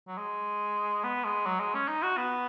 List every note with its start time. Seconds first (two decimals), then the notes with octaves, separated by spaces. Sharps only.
0.08 F#3
0.18 G#3
1.04 B3
1.24 G#3
1.46 F#3
1.60 G#3
1.74 C#4
1.88 D#4
2.03 F#4
2.17 B3